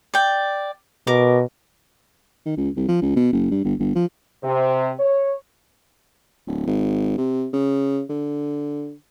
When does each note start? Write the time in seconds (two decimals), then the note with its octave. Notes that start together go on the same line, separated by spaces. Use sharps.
0.14 D5 G5
1.07 B2 A#4 D6
2.46 D#3
2.57 C#2
2.76 C2
2.88 F3
3.01 C#2
3.16 B2
3.32 F#1
3.51 G2
3.64 G1
3.79 G1
3.95 F3
4.44 C3
5.00 C#5
6.47 D1
6.67 G#1
7.18 C3
7.53 C#3
8.09 D3